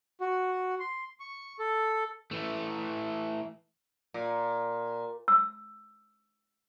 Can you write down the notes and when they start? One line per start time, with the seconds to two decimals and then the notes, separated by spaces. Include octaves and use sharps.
0.20 F#4
0.80 C6
1.20 C#6
1.59 A4
2.31 E3 A3
4.14 A#2
5.28 E6